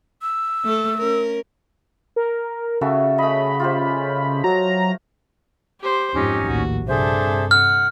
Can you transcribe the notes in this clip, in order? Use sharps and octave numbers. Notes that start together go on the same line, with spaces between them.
E6
A3 A4
C#4 A#4
A#4
C#3 F#4 A4 E5
A3 D#5 B5
F4 G4 C5
F#3 A#5
G4 C5
F2 G#2 C#4 D#4 G4
A#1 D#2 A2 F#4
G2 C3 D4 G#4 A4 C5 E5
F#5 F6